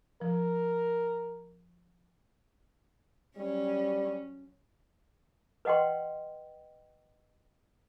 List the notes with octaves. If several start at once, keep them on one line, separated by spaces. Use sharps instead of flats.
F3 A#4
F#3 G3 C#4
B4 D#5 F#5 G5 C6